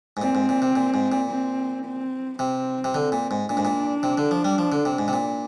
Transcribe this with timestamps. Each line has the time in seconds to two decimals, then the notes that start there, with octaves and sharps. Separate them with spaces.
0.17 G#2
0.22 A#2 C4
0.35 G#2
0.49 A#2
0.62 C3
0.76 A#2
0.94 G#2
1.12 A#2
1.30 C4
1.85 C4
2.39 C3 C4
2.84 C3
2.94 D3
3.12 A#2
3.31 G#2
3.49 A#2 D4
3.57 G#2
3.65 A#2
4.03 C3
4.18 D3
4.31 F3
4.45 G3
4.58 F3
4.72 D3
4.85 C3
4.99 G#2
5.08 C3
5.13 A#2